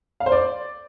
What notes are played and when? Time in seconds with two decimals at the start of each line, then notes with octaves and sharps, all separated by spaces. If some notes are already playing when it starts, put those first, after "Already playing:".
0.20 F5
0.26 C5
0.32 D5